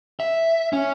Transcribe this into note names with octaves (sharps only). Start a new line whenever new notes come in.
E5
C#4